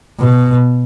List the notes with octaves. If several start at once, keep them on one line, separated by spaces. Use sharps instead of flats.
B2